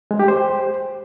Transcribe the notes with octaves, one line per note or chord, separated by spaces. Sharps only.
G#3
G4
C5